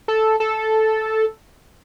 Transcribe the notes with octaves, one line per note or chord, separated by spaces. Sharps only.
A4
A4